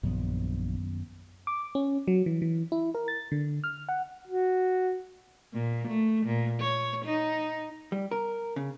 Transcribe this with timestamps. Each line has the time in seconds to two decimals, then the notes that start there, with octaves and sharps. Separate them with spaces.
0.03 A#1 F#2 D#3 B3
1.47 D6
1.75 C#4
2.08 F#3
2.26 E3
2.42 E3
2.72 E4
2.95 A#4
3.08 A6
3.32 D3
3.64 F6
3.89 F#5
4.27 F#4
5.53 A#2
5.88 A3
6.26 A#2
6.60 C#5
7.05 D#4
7.92 G3
8.11 A#4
8.56 C#3